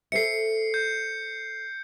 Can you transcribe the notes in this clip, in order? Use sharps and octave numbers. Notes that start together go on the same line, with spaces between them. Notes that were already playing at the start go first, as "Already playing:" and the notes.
A4 C5 E5 C7 C#7
G6